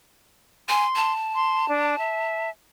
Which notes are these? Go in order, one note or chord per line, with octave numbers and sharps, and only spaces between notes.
G#5 C6
A5
C6
D4
E5